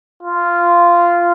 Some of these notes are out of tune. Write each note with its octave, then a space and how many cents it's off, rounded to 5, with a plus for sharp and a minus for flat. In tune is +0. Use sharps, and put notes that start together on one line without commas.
F4 -10